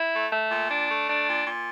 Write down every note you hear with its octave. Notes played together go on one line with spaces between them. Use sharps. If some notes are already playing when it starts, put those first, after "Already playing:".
Already playing: E4
A3
A3
A#2
D4
A3
D4
A#2
A#2